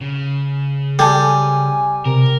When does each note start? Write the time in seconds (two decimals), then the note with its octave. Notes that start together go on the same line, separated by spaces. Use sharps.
0.01 C#3
0.99 G3 A4 G#5 A5
2.05 C3 A#4